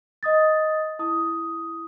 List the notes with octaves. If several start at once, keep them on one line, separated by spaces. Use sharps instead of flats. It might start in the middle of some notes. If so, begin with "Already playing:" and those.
D#5 D#6 A6
E4 D#6